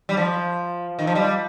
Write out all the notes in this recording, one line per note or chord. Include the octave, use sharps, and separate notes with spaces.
G3
F3
D#3
F3
G3